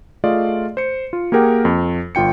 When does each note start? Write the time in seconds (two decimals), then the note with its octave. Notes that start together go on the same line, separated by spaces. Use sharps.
0.24 A3 F4 G#4 D5 D#5 F5
0.77 C5 C#7
1.13 F4
1.32 A#3 G4 G#4 A#4 F#5 G5
1.65 F2
2.15 G1 F4 G5 C#7